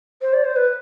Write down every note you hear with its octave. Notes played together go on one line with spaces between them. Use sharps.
C5
D5
C5
B4